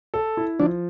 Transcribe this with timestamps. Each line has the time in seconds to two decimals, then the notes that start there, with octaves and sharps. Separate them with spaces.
0.14 A4
0.37 E4
0.59 F3 D4